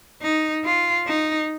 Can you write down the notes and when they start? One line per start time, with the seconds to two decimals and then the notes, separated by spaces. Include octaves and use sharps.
0.23 D#4
0.65 F4
1.07 D#4